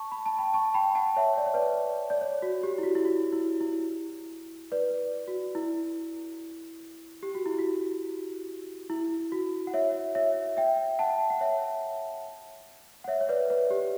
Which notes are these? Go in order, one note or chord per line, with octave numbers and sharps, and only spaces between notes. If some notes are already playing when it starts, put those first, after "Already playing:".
Already playing: A5 C#6
B5
A5
G5 B5
A5 C#6
G5 B5
F#5 A5
C#5 E5
D5
C#5
B4 D5
D5
C#5
F#4
G4
E4
F#4
E4
F#4
E4
E4
B4 D5
F#4
E4
G4
F#4
E4
F#4
E4
F#4
F#5
C#5 E5
C#5 E5
E5 G5
F#5 A5
F#5
C#5 E5
F#5
C#5 E5
C#5
B4 D5
B4
G4